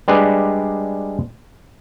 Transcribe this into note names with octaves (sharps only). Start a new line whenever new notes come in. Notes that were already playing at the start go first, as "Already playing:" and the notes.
G3 G#3 D4 B4